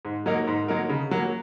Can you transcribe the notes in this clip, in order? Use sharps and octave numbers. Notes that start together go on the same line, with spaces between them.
G#2
F#3 A#3 D#4 A#4
G#2
F#3 A#3 D#4 A#4
C#3
F#3 A#3